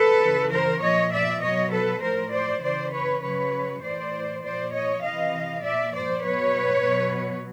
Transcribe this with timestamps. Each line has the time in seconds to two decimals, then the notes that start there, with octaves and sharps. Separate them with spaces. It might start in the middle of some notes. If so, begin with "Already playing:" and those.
Already playing: A4 B4
0.20 C#3 E3
0.51 A#4 C5
0.81 A#2 F3 C#5 D#5
1.11 D5 E5
1.41 B2 F#3 C#5 D#5
1.71 A4 B4
2.01 A2 F3 A#4 C5
2.31 C5 D5
2.62 C#3 E3 C5 D5
2.92 B4 C#5
3.22 C#3 F#3 B4 C#5
3.82 A2 E3 C5 D5
4.42 A#2 F3 C5 D5
4.72 C#5 D#5
5.02 C3 E3 D#5 F5
5.62 A#2 F3 D5 E5
5.92 C5 D5
6.23 B2 F#3 B4 C#5
6.83 B2 F#3